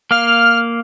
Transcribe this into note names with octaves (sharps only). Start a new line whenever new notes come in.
A#3 F5 F6